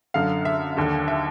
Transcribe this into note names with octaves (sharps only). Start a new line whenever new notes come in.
F#2 D3 F5
E5
D#2 D3
E5